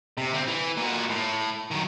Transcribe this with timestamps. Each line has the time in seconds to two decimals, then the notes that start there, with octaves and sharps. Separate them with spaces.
0.17 C3
0.34 D3 C4
0.47 E3
0.77 A#2 F#4
1.10 A2
1.71 D#3 F#3